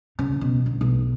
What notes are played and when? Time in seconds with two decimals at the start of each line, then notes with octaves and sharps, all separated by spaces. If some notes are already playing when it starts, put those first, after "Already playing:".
0.19 C#3
0.41 B2
0.66 D3
0.81 B1